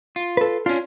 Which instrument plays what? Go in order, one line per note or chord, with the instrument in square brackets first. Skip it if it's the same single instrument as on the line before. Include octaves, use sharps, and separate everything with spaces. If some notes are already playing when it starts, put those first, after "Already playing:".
[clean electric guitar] F4
[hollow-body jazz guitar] A4 B4
[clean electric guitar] C#4 D4 [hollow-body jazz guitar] F4